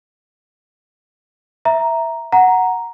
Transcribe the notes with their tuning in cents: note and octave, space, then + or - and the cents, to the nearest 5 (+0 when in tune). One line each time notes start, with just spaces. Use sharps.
E5 +0 A#5 +0
F#5 +0 A#5 +0